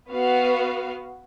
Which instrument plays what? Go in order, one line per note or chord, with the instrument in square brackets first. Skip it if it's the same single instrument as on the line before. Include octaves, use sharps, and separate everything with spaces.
[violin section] B3 F#4 F5